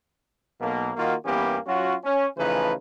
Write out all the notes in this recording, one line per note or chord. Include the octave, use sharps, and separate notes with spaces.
B1 B2 A#3
D#3 A#3 F4 F#4
G2 E3 A#3 B3 C#4 G4
F#3 C#4 F4 F#4
C#4
C#3 E3 F3 A3 D#4 B4